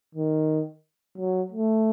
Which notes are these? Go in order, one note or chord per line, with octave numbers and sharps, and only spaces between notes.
D#3
F#3
A3